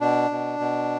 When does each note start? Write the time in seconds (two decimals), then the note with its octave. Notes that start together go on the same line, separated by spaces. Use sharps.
0.01 B2 D4
0.31 B2
0.60 B2